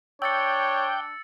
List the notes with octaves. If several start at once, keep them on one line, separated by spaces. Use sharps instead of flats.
D4 C#5 G5 E6 A6 C#7